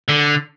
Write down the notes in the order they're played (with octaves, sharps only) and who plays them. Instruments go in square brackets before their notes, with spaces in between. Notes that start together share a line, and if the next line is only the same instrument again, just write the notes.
[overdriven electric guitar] D3